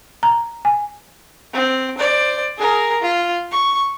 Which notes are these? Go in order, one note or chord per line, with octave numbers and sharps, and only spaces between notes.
A#5
G#5
C4
C5 D5
G#4 A#4
F4
C#6